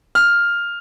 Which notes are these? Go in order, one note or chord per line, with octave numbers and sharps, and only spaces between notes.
F6